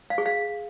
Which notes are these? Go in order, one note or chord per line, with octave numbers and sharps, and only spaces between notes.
F5
G#4
F5